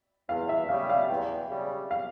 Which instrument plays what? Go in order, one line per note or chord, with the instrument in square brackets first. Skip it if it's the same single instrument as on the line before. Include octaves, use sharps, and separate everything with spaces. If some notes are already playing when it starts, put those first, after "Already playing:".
[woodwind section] E2 [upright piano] F5
[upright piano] E5
[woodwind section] C#3 G3 [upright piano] F5
[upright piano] F5
[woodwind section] E2 [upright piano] G5
[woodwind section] C#3 G3
[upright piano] F5